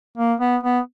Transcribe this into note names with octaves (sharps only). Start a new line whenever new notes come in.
A#3
B3
B3